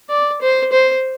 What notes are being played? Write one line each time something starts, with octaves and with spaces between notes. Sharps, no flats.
D5
C5
C5